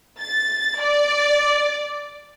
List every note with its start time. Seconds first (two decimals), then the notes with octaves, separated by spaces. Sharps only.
0.19 A6
0.79 D5